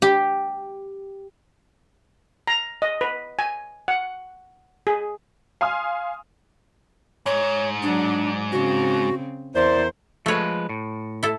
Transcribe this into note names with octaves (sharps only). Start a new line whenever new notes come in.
G4
A#5
D#5
B4
G#5
F#5
G#4
F5 G#5 C6 D#6 F6
G#2 C#5
F#3 D4 D5
C#3 C4 F#4
E2 E4 A#4 C5 D5
F3 G#3 A3 B4 C#5
A2
E4 A4